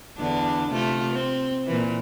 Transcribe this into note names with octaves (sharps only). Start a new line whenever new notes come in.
E2 D3 D4
C3 A3 F4
C4
A#2 E3